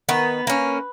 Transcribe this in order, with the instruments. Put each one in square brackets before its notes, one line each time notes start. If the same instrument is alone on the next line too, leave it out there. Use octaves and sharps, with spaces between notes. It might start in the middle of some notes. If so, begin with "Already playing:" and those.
[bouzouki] D#3 B3 B4
A#3 C#4